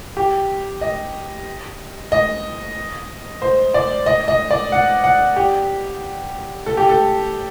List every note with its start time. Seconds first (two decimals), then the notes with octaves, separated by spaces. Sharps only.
0.17 G4
0.81 D#5
2.12 D#5
3.42 C5
3.74 D5
4.06 D#5
4.28 D#5
4.51 D5
4.72 F#5
5.04 F#5
5.36 G4
6.66 A4
6.77 G4
6.89 A4